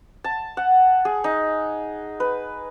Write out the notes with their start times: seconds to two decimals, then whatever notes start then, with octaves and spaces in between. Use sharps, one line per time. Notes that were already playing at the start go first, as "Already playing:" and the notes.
0.24 A5
0.57 F#5
1.05 G#4
1.24 D#4
2.20 B4